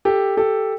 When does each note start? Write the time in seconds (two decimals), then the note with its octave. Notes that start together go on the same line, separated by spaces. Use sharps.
0.05 G4 A4
0.37 G4 A4